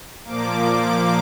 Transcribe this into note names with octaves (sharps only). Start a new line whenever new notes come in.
A#2 F3 A#3 D6